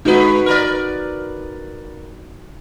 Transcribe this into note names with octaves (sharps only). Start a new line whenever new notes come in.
G#3 D#4 F#4 B4
A#4 B4 D5